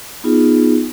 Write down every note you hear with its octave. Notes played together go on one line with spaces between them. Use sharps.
B3 D#4 F4 G#4